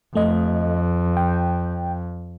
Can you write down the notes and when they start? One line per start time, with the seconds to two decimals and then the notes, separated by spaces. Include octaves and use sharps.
0.15 F2 A3 D#5
1.17 G5